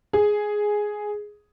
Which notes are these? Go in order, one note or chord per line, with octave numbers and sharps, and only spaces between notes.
G#4